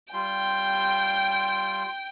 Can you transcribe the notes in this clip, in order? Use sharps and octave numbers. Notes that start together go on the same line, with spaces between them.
G3 F4 G5 C6